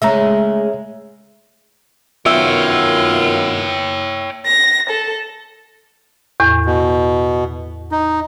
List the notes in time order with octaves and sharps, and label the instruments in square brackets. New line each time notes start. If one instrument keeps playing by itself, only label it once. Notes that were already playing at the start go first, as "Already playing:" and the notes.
[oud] C#3 G#3 A3 [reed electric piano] E5 A#5
[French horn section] F#2 D#3 B3 [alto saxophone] F4 [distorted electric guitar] C#5 G5 [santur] E5
[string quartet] A#6
A4
[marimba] E2 A2
[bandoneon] B2
D#4